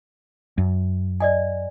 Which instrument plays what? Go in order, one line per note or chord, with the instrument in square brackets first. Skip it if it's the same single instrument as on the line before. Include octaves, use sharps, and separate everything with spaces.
[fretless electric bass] F#2
[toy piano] D5 D#5 G#5